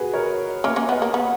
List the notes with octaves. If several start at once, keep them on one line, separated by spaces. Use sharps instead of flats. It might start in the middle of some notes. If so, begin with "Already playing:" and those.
Already playing: F#4 G#4 B4
A#4 C#5
A#3 C#4 C#5 E5
A#3 C#4
B3 B4 D#5
A#3
B3